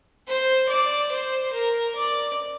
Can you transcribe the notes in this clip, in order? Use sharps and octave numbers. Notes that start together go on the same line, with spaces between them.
C5
D5
C5
A#4
D5